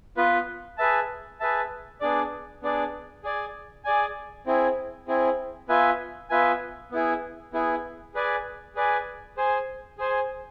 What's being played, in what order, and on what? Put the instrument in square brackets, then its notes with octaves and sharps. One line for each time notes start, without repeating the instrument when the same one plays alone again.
[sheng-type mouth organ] B3 F4 B4
G#4 B4 E5 A5
G#4 B4 E5 A5
B3 D4 G#4 D5
B3 D4 G#4 D5
G#4 D5 G#5
G#4 D5 G#5
C4 E4 G#4
C4 E4 G#4
B3 F4 B4 E5 G#5
B3 F4 B4 E5 G#5
B3 E4 G#4
B3 E4 G#4
G#4 B4 D5 G#5
G#4 B4 D5 G#5
G#4 C5 G#5
G#4 C5 G#5